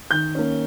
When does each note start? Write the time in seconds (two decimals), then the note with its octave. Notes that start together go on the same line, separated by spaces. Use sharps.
0.11 D#3 G6
0.35 A#3 C#4